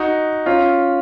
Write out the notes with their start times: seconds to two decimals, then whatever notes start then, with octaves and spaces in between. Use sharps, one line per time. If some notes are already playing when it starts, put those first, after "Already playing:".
Already playing: D#4 F#4
0.46 C#4 F4